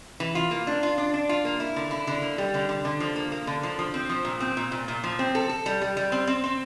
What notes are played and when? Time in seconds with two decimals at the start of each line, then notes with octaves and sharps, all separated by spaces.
0.20 E3
0.35 F4
0.51 A#3
0.67 D4
0.83 F4
0.98 D4
1.14 D4
1.29 F4
1.45 A#3
1.60 E4
1.76 D3
1.91 E4
2.07 D3
2.22 A#3
2.38 G3
2.54 D3
2.69 D3
2.85 D3
3.00 F3
3.16 A#3
3.32 A#3
3.47 D3
3.63 F3
3.79 F3
3.94 C4
4.09 F3
4.25 A#2
4.40 C4
4.57 A#2
4.72 A#2
4.88 A#2
5.04 F3
5.19 C4
5.35 A4
5.49 A4
5.66 G3
5.82 G3
5.97 G3
6.12 C4
6.27 C4
6.44 C4